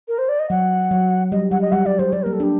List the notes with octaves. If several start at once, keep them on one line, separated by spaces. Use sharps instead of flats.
A#4
C5
D5
D#5
F#3 F#5
F#3
G3 D#5
G3 F#5
D#5
G3 F#5
G3 D5
G3 C5
G3 D5
A#3 A#4
A4
D4 G4